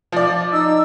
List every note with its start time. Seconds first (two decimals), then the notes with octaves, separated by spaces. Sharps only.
0.12 F3 D5
0.53 D#4 E6